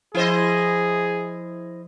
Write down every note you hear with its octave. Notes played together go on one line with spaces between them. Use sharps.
F3 E4 G#4 C5 D#5